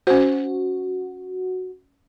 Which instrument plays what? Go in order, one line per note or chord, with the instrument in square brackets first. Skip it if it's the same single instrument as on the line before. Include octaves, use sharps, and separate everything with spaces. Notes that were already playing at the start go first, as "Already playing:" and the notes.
[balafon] C#4 C5 [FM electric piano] F#4